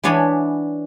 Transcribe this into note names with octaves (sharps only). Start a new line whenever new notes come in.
E3 B3 D4 C#5 G#5 B5